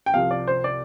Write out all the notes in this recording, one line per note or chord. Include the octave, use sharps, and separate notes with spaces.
G5
C2 C3 F3 F5
D5
C5
D5